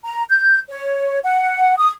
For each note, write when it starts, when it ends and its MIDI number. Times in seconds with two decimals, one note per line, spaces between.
0.04 0.24 82
0.29 0.59 91
0.70 1.19 73
1.24 1.74 78
1.78 1.90 87